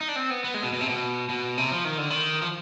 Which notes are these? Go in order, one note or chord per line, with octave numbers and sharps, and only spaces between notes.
D#4
D4
C4
B3
B3
G#3
B2
B2
C3
B2
B2
C3
F3
D#3
D3
D#3
F3